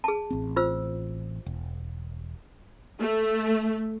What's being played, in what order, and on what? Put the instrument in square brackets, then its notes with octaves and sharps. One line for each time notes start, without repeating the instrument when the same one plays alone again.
[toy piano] G#4 A5
[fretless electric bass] A1 C4
[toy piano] F4 C5 E6
[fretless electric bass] E1
[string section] A3